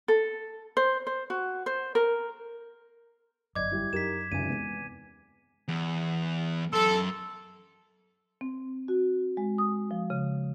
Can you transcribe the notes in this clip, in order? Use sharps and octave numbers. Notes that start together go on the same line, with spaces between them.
A4
C5
C5
F#4
C5
A#4
G1 F#2 D5 D#5 D6 G#6
G3 E4
F#2 D#4 G4 A#4 B6 E7
G#1 C#2 F#2 C3 G#5 D#7
E2 G#3
E2
F#2 A4 C6
C4
F#4
G#3
D#6
F3
C#3